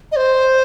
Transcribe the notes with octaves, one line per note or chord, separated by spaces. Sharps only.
D#5
C5